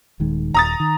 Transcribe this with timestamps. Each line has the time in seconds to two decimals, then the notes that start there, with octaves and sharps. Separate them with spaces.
0.20 D#1 D#3 G#3
0.54 D#1 A#5 D#6 A6
0.80 D#3